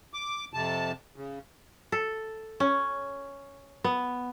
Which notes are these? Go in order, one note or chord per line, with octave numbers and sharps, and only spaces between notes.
D6
F2 C3 A5
C#3
A4
C#4
B3